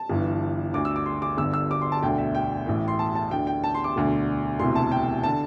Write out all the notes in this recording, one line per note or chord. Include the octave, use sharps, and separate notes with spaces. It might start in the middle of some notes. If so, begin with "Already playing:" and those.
Already playing: A5
G1 G2 E3
D2 D3 D6
E6
D6
C6
D6
G1 G2 D3 E6
E6
D6
C6
A5
E1 D2 D3 G5
E5
G5
A1 A2 E3
C6
A5
A5
D2 D3 G5
G5
A5
C6
D6
E1 D2 D3
E1 D2 C3 E3 C6
A5
G5
D3 A5